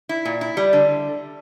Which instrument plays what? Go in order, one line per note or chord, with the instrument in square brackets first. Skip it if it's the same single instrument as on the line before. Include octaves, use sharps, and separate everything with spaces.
[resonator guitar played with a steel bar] E4
A#2
E4
G3
D3